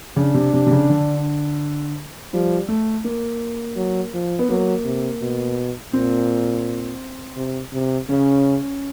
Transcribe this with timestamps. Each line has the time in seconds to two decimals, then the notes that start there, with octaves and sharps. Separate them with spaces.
0.16 C#3 D4
0.34 C3
0.53 C3
0.66 C3
0.71 C#3
0.90 D3
2.33 F3 G3
2.68 A3
3.04 A#3
3.77 F#3
4.13 F3
4.39 B3
4.49 F#3 A#3
4.85 C3
5.22 B2
5.93 A#2 C4
7.37 C3
7.73 C3
8.09 C#3 C#4